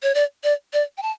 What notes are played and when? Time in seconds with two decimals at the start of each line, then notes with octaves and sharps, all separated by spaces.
0.03 C#5
0.15 D5
0.44 D5
0.73 D5
0.98 G5
1.02 A5